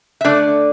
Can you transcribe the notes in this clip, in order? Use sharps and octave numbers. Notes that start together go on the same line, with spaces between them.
E5
D3 A3 D4 D5